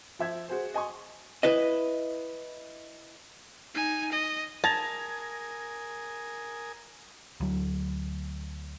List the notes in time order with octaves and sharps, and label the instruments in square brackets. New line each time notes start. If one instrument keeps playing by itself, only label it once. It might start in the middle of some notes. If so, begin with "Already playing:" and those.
[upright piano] F3 E5 G#6
F#4 G#4 C5
D#5 G#5 C6 C#6
[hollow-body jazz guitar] E4 B4 D#5
[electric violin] D#4 G#5
D#5
[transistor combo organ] A#4 G#5 D#6 [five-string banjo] A5 [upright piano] G#6 A#6 F7
[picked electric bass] D2 F#3